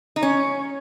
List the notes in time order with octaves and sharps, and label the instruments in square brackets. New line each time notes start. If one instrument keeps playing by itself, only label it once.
[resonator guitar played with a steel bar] D#4
[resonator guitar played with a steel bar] C#4 [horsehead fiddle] C#5